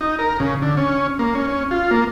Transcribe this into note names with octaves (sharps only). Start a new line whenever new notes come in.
D#4
A#4
C#3
D3
C#4
A#3
C#4
C#4
F4
A#3